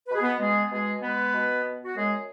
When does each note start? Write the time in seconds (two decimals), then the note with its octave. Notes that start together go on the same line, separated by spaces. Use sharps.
0.08 B2 B4
0.15 G#4
0.22 B3 B4
0.39 G#3 B3 G#4
0.70 B2 G#3 G#4
1.02 G#3 B3 B4
1.33 B2
1.64 B3
1.85 F#4
1.95 F#2 G#3 G#4